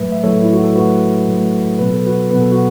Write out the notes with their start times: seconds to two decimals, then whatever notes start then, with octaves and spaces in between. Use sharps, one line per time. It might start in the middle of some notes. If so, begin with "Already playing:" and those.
Already playing: A2 F#3 A3 B4 E5
0.12 E5
0.23 A2 F#3 A3 A4 C#5
0.42 E4
0.53 F#4
0.64 A4
0.75 A2 F#3 A3 F#4 B4
1.27 A2 F#3 A3
1.79 B2 F#3 B3 B4
1.93 A4
2.07 F#4 B4
2.30 B2 F#3 B3 B4
2.41 A4
2.52 F#4